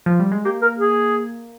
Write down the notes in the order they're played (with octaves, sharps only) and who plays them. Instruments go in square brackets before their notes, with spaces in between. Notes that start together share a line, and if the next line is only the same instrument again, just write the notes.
[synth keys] F3
G3
G#3
[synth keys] A#3 [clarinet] G4
[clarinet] A#4
G#4